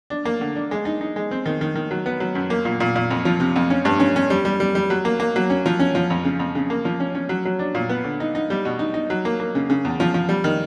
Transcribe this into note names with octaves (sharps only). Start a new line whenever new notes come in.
D4
A#3
D3
D4
G#3
D#4
D#4
G#3
C4
D#3
D#3
D#3
F#3
B3
F#3
F#2
A#3
A#2
A#2
A#2
F2
F3
C3
F2
C#4
G2
C#4
C#4
G3
G3
G3
G3
F#3
A#3
A#3
F#3
C#4
F3
C#4
F3
F2
C#3
F2
C#3
A#3
F3
C#4
C#4
F#3
F#3
D4
A#2
B3
D3
D#4
D#4
G3
B2
D#4
D#4
F#3
A#3
A#3
C#3
C#3
E2
F3
F3
G3
D#3